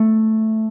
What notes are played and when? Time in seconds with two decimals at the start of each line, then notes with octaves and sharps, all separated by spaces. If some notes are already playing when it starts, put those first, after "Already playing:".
Already playing: A3